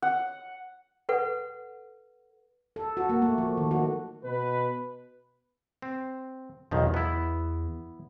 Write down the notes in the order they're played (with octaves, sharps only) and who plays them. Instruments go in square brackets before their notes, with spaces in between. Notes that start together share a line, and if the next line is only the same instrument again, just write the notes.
[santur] F#5
[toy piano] A4 B4 F#5
[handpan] A4
F#4
A#3
A3
F3
D#3
F#4
[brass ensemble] B2 B4
[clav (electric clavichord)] C4
[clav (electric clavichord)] B1 D#3 F3 [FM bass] E2
[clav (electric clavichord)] B3 E4